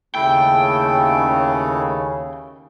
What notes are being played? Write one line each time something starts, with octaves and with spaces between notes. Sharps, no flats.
D#2 C#3 A3 E4 A4 G5